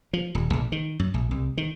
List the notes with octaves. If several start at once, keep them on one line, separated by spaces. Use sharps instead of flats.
F3
D#1
A#1
D#3
F#2
A#1
C2
D#3